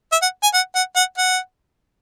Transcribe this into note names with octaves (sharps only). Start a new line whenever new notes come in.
E5
F#5
G#5
F#5
F#5
F#5
F#5